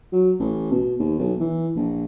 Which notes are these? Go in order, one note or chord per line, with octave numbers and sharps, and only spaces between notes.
F#3
A1
B2
D#2
B1
E3
A#1